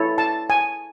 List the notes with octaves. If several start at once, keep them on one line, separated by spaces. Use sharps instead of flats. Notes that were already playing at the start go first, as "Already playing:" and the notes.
Already playing: E4 A4 C#5
A5
G#5